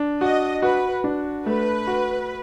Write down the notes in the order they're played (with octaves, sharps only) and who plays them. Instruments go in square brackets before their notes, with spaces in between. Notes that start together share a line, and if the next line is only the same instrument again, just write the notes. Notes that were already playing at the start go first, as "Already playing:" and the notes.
Already playing: [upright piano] D4
[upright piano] F#4 [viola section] D#5
[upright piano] F#4 [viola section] B4
[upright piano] D4
[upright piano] A3 [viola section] B4
[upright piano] F#4